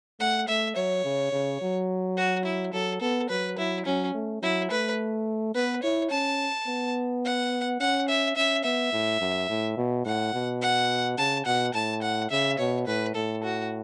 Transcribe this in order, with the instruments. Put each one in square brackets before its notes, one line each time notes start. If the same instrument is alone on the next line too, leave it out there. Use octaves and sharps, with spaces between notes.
[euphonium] A3 [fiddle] F#5
[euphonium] A3 [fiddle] E5
[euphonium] F#3 [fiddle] C#5
[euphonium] C#3
C#3
F#3
[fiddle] F#4
E4
[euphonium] F#3 [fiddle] A4
[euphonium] B3 [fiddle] A4
[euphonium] F#3 [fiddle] B4
[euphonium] F#3 [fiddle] E4
[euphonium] F#3 [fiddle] C#4
[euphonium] A3
[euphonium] F#3 [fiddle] E4
[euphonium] A3 [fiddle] B4
[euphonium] B3 [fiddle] B4
[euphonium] E4 [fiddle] C#5
[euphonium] C#4 [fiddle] A5
[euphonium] B3
[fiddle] F#5
[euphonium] C#4 [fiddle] F#5
[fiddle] E5
[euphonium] C#4 [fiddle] E5
[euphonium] B3 [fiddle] E5
[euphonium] A2
F#2
A2
B2
[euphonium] A2 [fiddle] F#5
[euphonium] B2
[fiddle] F#5
[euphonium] C#3 [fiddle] A5
[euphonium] B2 [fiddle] F#5
[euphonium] A2 [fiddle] A5
[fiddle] F#5
[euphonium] C#3 [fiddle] E5
[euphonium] B2 [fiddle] C#5
[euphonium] A2 [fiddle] B4
[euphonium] A2 [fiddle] A4
[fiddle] F#4